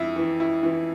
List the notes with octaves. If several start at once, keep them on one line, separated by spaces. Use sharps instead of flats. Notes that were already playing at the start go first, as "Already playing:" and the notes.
Already playing: F2 E4
E3
E4
E3